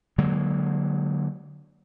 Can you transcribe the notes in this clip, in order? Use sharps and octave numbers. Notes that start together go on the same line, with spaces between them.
D3 F#3 G#3 A#3